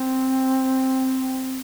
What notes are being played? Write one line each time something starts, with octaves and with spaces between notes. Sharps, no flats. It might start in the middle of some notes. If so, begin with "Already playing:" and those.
Already playing: C4